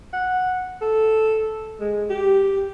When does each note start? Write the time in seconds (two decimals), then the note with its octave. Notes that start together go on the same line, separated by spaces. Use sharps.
0.13 F#5
0.82 A4
1.80 G#3
2.10 G4